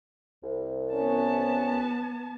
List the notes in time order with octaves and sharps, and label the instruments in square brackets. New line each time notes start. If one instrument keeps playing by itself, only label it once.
[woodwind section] C2
[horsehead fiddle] B3 A5 [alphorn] C#4